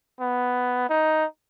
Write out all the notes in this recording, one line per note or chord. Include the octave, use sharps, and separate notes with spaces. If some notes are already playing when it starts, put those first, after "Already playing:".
B3
D#4